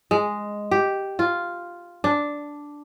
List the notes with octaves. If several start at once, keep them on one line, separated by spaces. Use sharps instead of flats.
G#3
G4
F4
D4